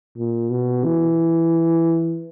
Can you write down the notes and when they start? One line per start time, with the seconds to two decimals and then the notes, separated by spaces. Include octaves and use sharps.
0.17 A#2
0.50 B2
0.85 E3